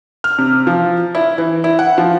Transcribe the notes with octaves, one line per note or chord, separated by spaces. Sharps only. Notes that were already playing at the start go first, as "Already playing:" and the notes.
F6
C3
F3
E4
E3
E4
F#5
F3